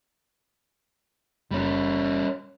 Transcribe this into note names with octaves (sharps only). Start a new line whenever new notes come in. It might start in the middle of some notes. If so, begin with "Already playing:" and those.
F#1 G3 C#4